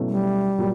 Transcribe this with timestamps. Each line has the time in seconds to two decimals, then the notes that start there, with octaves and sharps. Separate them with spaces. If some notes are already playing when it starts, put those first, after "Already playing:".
Already playing: B2 F#3 A3 C#4 E4
0.09 G3
0.58 A#2 F#3